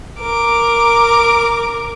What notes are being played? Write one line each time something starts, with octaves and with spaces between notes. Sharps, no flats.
A#4 D6